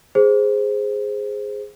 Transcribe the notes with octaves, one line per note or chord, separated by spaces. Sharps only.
G#4 C5